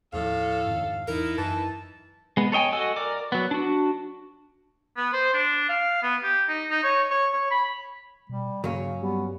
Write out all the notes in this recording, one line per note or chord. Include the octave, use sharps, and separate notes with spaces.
D#2 A2 F3 A4 F5
F2 G#2 D#3
E2 E3 D#4 E4 A#4
F#2 E3 A5
G#3 B3
A4 C#5 D#5 G5 G#5
F#4 A4 D#5 G#5 E6
A#4 D5 D6
F#3 B3
D4 F#4
B3
C5
D4
F5
B3
G4
D#4
D#4
C#5
C#5
C#5
B5
B2 G3
G2 C#3 F#3 A#3 C#4
G3 B3